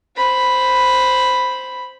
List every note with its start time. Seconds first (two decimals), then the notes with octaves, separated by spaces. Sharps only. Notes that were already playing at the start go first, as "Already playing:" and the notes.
0.17 C5 B5